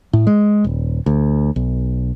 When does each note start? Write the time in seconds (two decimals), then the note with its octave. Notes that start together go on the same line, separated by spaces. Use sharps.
0.13 A2
0.27 G#3
0.64 D#1
1.06 D2
1.56 B1